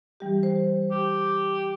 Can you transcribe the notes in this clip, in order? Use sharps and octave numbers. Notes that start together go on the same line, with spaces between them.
E3 G3 G4
C5
G4